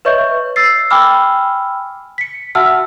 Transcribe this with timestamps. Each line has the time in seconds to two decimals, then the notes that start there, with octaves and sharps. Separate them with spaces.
0.05 B4 C#5 D#5 E5 C#6 G6
0.56 E6 A6 C7
0.90 G5 G#5 B5 D6 E6 F6
2.18 B6 C#7
2.55 F#4 E5 F#5 A5 E6 F6